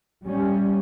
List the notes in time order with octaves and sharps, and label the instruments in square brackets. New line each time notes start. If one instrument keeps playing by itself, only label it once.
[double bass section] G3 C#4